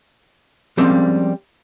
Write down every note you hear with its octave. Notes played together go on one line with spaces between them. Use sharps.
F3 G3 G#3 A#3 C4 C#4